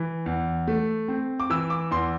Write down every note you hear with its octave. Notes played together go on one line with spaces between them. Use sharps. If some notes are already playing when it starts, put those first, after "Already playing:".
Already playing: E3
E2
A3
C4
D6
E3 E6
D6
E2 C6